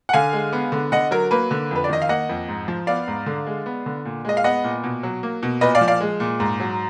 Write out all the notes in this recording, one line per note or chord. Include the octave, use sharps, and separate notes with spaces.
F#5
D3 F5 G#5
G#3
B3
D3
D3 D#5 F#5
F#3 A#4
A#3 B4
D3
F2 B4
D5
D#3 D#5
F5
A#3 D#5 F#5
F2
G#2
F3
B3 D5 F5
G#2
D3
G#3
B3
D3
A#2
G#3 D#5
F5
B3 D#5 F#5
A#2
B2
F#3
A#3
B2
A#2 B4 D#5
D5 F5
F3
D5 F5
G#3
A#2
G#2
F#3